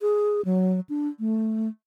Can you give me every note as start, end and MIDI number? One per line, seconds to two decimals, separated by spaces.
0.01 0.41 68
0.45 0.80 54
0.89 1.08 62
1.19 1.68 57